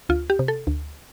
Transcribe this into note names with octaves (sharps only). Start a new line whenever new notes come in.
D2 F4
G4
C3
A4
D2